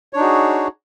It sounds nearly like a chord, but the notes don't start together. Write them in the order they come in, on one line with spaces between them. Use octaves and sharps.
C#5 D4 D#4 F#4 G#4